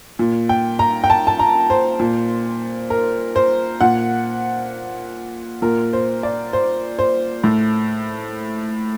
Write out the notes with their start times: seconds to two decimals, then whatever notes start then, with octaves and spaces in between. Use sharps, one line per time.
0.19 A#2
0.49 G5
0.79 A#5
1.04 G5
1.10 A5
1.27 A5
1.39 A#5
1.70 C5
1.99 A#2
2.90 A#4
3.36 C5
3.81 A#2 F#5
5.62 A#2 A#4
5.93 C5
6.23 D5
6.53 C5
6.99 C5
7.44 A2